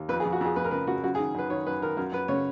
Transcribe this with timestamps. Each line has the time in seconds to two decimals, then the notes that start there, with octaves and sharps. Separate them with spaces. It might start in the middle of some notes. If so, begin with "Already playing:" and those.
Already playing: D#2
0.09 F2 B4
0.20 G#4
0.25 F2
0.32 F#4
0.41 F2 G#4
0.56 F2 B4
0.64 A#4
0.71 C#3 B4
0.87 C#3 F#4
1.04 F#2 F#4
1.15 G#4
1.19 D#3
1.35 F#2 B4
1.50 D#3 C#5
1.67 F#2 B4
1.82 D#3 A#4
1.97 F#2 A#4
2.12 F#2 B4
2.28 C#3 C#5